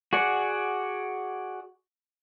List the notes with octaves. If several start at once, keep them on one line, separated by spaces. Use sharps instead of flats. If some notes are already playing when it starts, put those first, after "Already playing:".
F#4 G#4 D5 F#5